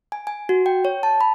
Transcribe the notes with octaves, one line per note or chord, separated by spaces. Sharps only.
G#5
G#5
F#4
G5
C#5
A5
B5